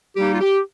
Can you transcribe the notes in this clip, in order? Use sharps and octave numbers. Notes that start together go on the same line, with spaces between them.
G3 A#3 D#4 G4
F4
G4